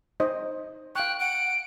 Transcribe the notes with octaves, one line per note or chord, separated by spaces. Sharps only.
D#4 C5 D#5
F5 G5 C#6 F#6
F#5 D7